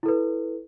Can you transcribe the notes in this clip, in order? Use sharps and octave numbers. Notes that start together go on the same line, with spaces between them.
E4 A4 B4